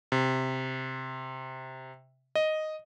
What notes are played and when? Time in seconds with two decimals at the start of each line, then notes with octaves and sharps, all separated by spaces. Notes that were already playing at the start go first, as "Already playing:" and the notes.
0.12 C3
2.35 D#5